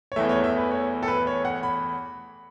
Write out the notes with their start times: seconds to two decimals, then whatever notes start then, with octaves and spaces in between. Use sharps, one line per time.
0.12 C#5
0.16 E2 E3 A3 E5
0.29 C#5
0.44 E5
0.58 B4
0.71 C#5
1.03 A4
1.08 B4
1.27 C#5
1.45 F#5
1.63 B5